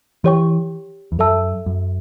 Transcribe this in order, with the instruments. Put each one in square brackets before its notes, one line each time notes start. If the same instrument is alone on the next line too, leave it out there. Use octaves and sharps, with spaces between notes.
[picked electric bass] E3 [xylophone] G4 C#5 G5 C#6
[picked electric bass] E2
[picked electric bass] F#2 [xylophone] A4 E5 A5 E6
[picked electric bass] F#2